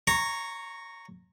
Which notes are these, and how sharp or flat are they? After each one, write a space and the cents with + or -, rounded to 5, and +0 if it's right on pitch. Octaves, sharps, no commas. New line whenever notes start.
C#5 +0 A#5 -10 C#6 -40